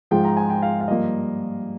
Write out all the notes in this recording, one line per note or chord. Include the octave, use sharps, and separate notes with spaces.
G#2 F3 G#3 G5
A#5
G#5
G5
F5
F5
G2 F3 A#3 D#5